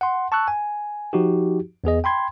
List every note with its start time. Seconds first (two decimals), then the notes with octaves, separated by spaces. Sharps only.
0.01 F#5 C6
0.32 A5 C#6 E6 F#6
0.48 G#5
1.13 F3 D#4 F#4 G4
1.84 E2 B3 G#4 D#5
2.04 G5 B5 C6 G#6